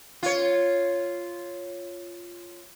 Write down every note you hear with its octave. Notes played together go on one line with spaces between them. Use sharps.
F4 C#5